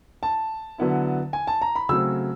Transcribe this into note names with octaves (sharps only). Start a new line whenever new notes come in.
A5
D3 F#3 B3 E4
G#5
A5
A#5
B5
C#3 F#3 A3 C4 E6